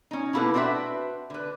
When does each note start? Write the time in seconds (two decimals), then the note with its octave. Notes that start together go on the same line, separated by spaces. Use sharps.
0.11 C#4 D#4
0.33 B2 A#3 E4 G4 A4 B4
0.54 C4 D4 F#4 B4 E5
1.30 D3 B4